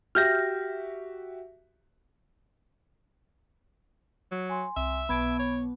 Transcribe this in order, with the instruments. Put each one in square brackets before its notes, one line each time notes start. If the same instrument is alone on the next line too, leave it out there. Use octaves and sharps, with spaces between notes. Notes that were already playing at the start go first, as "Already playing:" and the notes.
[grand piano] F#4 G4 E5 [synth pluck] F6 G6 A#6
[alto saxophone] F#3
[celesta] G#5 C6
[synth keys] C2 [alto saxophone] E5
[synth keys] B1 B3 [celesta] B5 G#6 D7
[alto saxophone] C#5